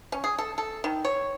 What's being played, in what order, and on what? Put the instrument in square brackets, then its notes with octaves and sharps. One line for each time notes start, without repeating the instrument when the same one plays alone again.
[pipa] C#4
G#4
A4
A4
D#3
C#5